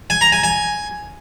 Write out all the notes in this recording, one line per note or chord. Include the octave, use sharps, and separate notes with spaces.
G#5
A#5
G#5
G#5